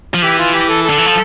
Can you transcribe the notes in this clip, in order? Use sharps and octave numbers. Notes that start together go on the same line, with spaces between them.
F3
E3 G4
F4
G4
A4
A4
D3
E3
F3